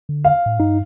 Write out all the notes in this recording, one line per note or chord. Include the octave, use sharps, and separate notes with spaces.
D3
F5
A2
G2 D#4